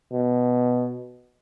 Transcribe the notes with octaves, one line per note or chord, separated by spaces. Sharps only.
B2